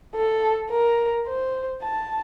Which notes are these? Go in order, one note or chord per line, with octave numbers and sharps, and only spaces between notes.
A4
A#4
C5
A5